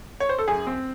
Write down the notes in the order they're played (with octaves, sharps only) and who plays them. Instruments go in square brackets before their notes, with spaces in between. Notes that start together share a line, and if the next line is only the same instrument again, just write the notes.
[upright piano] C#5
C5
A4
F#2 G#4
C4